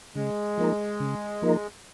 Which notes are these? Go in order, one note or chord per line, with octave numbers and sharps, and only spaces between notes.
C#3 G#3
F3 A#3 D#4 A#4
C#3
F3 A#3 D#4 A#4